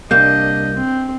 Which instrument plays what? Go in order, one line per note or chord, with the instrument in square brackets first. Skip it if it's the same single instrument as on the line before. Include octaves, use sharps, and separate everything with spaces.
[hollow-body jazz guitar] C2 A#3 [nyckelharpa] D4 D#5 [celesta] G6
[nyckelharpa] C4